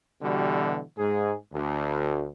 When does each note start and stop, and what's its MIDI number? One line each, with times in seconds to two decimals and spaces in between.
0.22 0.82 47
0.22 0.82 50
0.22 0.82 52
0.22 0.82 55
0.22 0.82 66
0.22 0.82 67
0.98 1.35 44
0.98 1.35 68
1.52 2.28 38